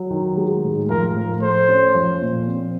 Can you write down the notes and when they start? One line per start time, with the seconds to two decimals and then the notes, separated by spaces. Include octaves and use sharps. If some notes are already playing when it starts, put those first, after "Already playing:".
Already playing: F#3
0.10 D#3
0.37 G#3
0.64 A2
0.90 F3 A#4
1.16 A2
1.42 A3 C5
1.69 C#4
1.95 F3
2.22 A#2
2.47 C4